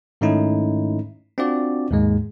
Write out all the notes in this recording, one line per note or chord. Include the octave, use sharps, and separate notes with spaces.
G#2 D#3 A3 C#4 D#4 E4
C4 D4 F4 F#4 D5
D#2 G#2 G#3